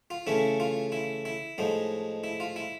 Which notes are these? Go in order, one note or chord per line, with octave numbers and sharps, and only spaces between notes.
F4
C#3 E3 A3 C#4 E4
F4
E4
E4
A2 F3 G#3 D#4
E4
F4
E4